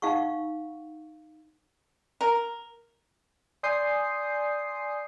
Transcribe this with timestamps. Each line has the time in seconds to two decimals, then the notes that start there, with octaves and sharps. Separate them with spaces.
0.02 D#4 F5 F#5 C#6
2.21 A#4
3.63 D5 G#5 C6 D#6 G6 C7